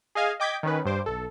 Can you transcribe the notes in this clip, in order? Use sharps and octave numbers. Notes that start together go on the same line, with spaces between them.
G#4 D#5 F5 G#5
D#5 G5 D6 G6 G#6 B6
D#3 C#4 B4
G2 C5 D6
B1 A4